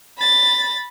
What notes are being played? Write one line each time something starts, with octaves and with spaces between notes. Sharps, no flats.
B5 A6